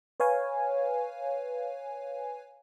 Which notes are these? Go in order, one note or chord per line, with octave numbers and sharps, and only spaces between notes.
B4 C#5 F5 G#5